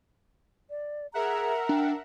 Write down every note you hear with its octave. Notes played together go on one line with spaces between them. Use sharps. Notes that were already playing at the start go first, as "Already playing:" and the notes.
D5
G#4 A#4 E5 F#5 A#5
D4 G5